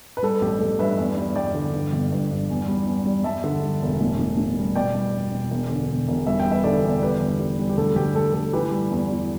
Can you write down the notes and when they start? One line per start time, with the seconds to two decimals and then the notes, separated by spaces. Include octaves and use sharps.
0.17 B4
0.23 G3 A4
0.41 A1 G4
0.60 A1 A4
0.79 G2 B4 E5
0.98 E2
1.17 G3
1.36 G3 D5 G5
1.54 D3
1.74 G2
1.93 G1
2.12 G2
2.30 G2
2.50 E2
2.68 G3
2.87 E2
3.06 G3
3.24 G3 E5 A5
3.44 D3
3.63 G3
3.82 E1
4.01 A2
4.19 A2
4.37 A2
4.57 G3
4.75 B2 D5 G5
4.95 G3
5.14 E2
5.32 B2
5.51 E1
5.69 D3
5.89 E1
6.08 E1
6.27 G3 E5
6.40 G5
6.45 G3
6.51 B4 E5
6.64 D3 A4 D5
6.83 E2
7.01 G3 G4 B4
7.21 G1
7.39 G3
7.59 G3
7.69 G4
7.77 D2 A4
7.96 D2 G4
8.15 D2 A4
8.33 D2 A4
8.53 E3 G4 B4
8.72 G3
8.91 E2
9.10 E3